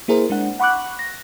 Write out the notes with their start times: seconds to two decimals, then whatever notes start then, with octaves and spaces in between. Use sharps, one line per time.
0.08 A#3 E4 G#4 A#4 C5
0.30 G#3 D4 F#5
0.60 F#5 B5 C#6 D6 F#6
0.99 A#6